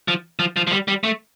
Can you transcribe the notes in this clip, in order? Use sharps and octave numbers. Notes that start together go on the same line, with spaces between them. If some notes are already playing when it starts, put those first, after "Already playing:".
F3
F3
F3
F3
G3
G3
A3